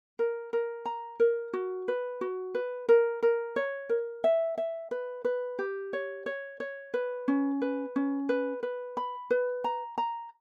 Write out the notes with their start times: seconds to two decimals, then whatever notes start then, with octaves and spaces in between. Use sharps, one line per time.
0.19 A#4
0.53 A#4
0.86 A#5
1.20 A#4
1.53 F#4
1.88 B4
2.21 F#4
2.55 B4
2.89 A#4
3.23 A#4
3.56 C#5
3.89 A#4
4.24 E5
4.58 E5
4.91 B4
5.25 B4
5.59 G4
5.93 C#5
6.26 C#5
6.60 C#5
6.94 B4
7.28 C#4
7.62 B4
7.96 C#4
8.29 B4
8.63 B4
8.97 B5
9.31 B4
9.64 A#5
9.98 A#5